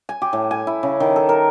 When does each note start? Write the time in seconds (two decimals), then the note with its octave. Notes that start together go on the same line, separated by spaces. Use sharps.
0.09 G#5
0.22 G4
0.33 A2
0.51 G#5
0.67 E4
0.83 C#3
1.00 D#3
1.16 A4
1.29 A#4